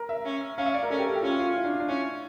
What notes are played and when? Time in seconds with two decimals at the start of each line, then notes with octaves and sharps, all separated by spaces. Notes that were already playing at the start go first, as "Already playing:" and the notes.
Already playing: A#4
0.09 E5
0.25 C#4
0.58 C#4 F5
0.66 E5
0.74 D5
0.83 A#4
0.90 C#4 A4
0.98 G4
1.06 A4
1.15 G4
1.22 C#4 F4
1.39 F4
1.56 E4
1.64 D4
1.80 D4
1.88 C#4 E4